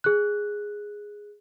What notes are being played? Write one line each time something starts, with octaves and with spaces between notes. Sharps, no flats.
G#4 F#6